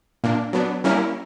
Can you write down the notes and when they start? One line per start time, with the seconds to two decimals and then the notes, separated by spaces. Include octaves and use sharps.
0.24 A#2 A#3 D4
0.53 F#3 B3 D4
0.84 G3 A#3 C#4 E4 A#4